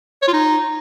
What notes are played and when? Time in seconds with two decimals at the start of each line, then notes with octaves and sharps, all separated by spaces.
0.22 C#5
0.28 F4
0.33 D#4